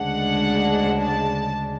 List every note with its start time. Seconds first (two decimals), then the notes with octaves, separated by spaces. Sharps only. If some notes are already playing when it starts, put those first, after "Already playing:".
Already playing: D2 C#3 G#3 D4 F#5
1.01 A5